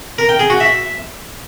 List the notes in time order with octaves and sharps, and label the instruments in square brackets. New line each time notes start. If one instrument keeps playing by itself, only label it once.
[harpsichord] A#4
G5
G#4
F#4
E5